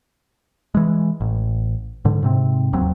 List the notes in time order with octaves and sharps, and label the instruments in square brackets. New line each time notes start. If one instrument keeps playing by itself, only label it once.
[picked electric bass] E3 G#3
A1
G#2 D3
G#2 C3 C4
E1 D#2 F#3 C4